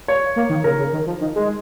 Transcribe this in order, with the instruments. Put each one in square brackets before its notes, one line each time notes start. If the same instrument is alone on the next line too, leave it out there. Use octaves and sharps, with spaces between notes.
[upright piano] C#5
[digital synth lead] A#3
D#3
[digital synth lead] C#3 [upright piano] A#4
[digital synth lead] C#3
D#3
F3
D#3
G#3